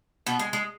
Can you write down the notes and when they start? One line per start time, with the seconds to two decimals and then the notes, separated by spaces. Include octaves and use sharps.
0.26 B2 B3
0.39 G#3
0.53 G#3